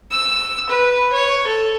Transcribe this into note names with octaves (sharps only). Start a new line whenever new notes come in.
E6
B4
C#5
A4